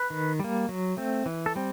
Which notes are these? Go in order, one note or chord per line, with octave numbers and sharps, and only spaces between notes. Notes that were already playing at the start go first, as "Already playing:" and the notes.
Already playing: B4
D#3
G3 A#3
F#3
A3 C4
E3
A4
G3 C4